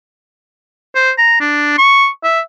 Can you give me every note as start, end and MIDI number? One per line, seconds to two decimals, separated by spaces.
0.95 1.11 72
1.18 1.36 82
1.40 1.76 62
1.78 2.08 85
2.24 2.40 76